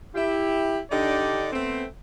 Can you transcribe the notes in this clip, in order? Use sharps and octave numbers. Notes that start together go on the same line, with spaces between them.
E4 G4
D3 D4 D#4 G4 D5
A3 B3 C4